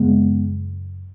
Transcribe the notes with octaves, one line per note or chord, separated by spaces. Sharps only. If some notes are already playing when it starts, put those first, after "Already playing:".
Already playing: F#2 C#3 G#3 B3